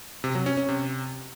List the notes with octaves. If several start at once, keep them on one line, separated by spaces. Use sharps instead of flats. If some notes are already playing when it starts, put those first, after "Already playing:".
C3
F#3
C#4
C#4
C3